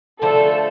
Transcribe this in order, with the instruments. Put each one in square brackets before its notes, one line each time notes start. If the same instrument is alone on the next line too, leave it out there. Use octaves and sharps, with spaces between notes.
[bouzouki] D3 F3 A3 [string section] A4